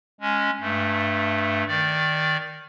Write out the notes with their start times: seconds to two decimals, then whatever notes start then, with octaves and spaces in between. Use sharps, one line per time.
0.21 G#3 C#4
0.61 G2 A3
1.68 D#3 D5